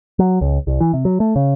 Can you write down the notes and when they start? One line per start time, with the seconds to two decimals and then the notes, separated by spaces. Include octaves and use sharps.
0.19 F#3
0.41 C#2
0.67 C2
0.80 E3
0.93 C3
1.05 F#3
1.20 A3
1.36 C#3